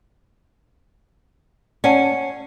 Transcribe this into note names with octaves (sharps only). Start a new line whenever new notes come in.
C#4 D5 F#5 A5